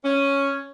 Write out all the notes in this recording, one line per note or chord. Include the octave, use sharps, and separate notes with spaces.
C#4